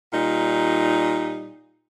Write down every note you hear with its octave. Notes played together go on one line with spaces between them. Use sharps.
A#2 G3 D#4